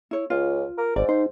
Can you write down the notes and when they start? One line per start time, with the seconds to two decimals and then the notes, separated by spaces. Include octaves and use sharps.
0.11 E4 C#5
0.30 C#2 F4
0.78 A#4
0.96 G#1 G#2 D5
1.09 D#4 C5